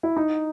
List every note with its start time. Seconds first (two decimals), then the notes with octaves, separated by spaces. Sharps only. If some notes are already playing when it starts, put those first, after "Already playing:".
0.03 E4
0.17 D#4